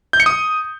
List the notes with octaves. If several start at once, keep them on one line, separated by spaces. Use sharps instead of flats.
G6
C#7
D#6